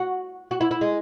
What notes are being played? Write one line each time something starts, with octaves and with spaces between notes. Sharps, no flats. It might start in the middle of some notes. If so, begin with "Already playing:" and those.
Already playing: F#4
F#4
E4
E4
G#3